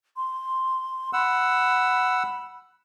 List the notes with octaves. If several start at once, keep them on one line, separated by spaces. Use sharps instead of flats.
C6
F#5 B5 E6